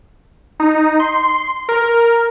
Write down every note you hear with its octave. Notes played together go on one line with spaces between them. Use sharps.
D#4
C6
A#4